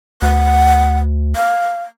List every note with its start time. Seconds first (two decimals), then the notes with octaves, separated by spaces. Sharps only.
0.22 D2 F#5
1.36 F5